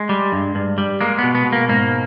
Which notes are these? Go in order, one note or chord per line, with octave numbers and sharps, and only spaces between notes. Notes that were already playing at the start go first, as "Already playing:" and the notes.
Already playing: G#3
G3
G2
G2
G3
G#3 A#3
B2 B3
B3
B2
A#3
G#2 A#3